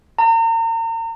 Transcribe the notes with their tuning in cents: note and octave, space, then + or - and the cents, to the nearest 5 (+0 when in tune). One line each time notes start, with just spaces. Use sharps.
A#5 -35